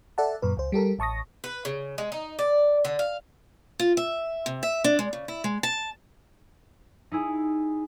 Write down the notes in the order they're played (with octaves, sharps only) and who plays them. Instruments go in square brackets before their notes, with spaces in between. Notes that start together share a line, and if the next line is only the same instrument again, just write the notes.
[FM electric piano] A4 D5 E5 F#5 A5
F#2 A#2 B4
C#2 C5
G3 G4 A4 A#4
A1 A5 C#6 D#6 A#6
[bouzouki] B4
C#3
G#3
D#4
D5
D3
F5
[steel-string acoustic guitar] F4
E5
C3
E5
D4
G#3
C#3
E4
G#3
A5
[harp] D#4 E4 G#4